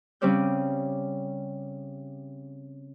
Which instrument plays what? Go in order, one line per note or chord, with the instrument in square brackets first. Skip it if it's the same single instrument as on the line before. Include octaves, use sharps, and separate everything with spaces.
[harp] C#3 G3 C4 C#4 D5 G6